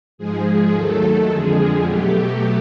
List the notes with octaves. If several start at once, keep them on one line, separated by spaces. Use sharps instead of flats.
G#2 F3 G#3 G#4
D#2 D#3 F#3 A3 A4
F2 D3 F3 G#3 G#4
B2 F#3 A3 G4